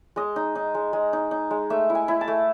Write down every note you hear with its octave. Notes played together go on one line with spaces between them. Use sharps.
G#3 D#5
D#4
D#4
G#3
G#3
D#4
D#4
G#3
A3 E5
E4
G#5
E4
A5
A3